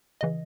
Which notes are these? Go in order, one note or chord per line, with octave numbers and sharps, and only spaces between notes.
C#3 E3 D#5